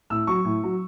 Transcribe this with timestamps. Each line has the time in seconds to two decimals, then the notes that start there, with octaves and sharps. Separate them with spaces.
0.10 A2 E6
0.27 F#3 C#6
0.45 A2
0.63 F#3